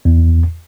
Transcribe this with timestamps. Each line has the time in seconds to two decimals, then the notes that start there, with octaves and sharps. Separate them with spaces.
0.05 E2